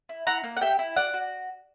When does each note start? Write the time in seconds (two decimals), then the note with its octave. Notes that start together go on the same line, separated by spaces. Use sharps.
0.09 E4
0.27 E4 F#5 A#5
0.44 A#3
0.57 F#5
0.61 G4 E5 G5
0.79 E4
0.96 F#4 D5 F#5
1.14 F#4